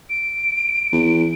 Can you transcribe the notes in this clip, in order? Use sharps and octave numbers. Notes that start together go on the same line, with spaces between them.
D7
E2